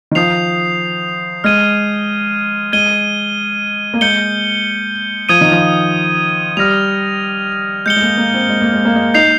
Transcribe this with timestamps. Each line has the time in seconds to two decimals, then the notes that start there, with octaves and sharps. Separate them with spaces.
0.11 D#3
0.15 F3 D#6 G6 C7 F7
1.44 G#3 F6 G#6 D#7 G7
2.72 G#3 G#6 D#7 G7
3.94 A#3
4.01 G#3 G6 C#7 G7
5.29 F3 D#6 G#6 D#7 G7
5.41 D#3
5.52 F3
6.57 G3 F6 A#6 F7
7.86 G#3 G6 C#7 G7
7.96 G#3
8.02 A#3
8.18 A#3
8.34 C4
8.50 G#3
8.62 A#3
8.74 G#3
8.85 A#3
8.96 G#3
9.14 D#4 G6 C7 F7